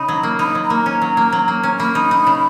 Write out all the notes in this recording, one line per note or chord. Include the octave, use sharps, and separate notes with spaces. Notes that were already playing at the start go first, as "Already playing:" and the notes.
Already playing: C#3 D#4 B5
F#3
A#3
D#4 B5
F#3
A#5
A#3
C#4
F#3
A#3
F#3
A#3
C#4
A#3 B5
D#4
D#4
C#3